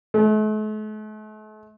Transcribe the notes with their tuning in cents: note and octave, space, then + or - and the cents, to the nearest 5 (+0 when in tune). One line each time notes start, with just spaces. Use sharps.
A3 -45